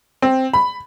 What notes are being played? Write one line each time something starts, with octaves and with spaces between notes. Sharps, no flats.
C4
B5